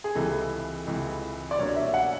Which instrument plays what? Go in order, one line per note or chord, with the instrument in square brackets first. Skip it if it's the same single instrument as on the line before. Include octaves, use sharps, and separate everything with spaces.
[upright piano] G#4
[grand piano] C#2 C3 E3 [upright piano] A4
[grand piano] C#2 C3 E3
[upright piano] D5
[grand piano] C2 B2 F#3 A#3 D4 [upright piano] C#5
[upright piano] E5
F#5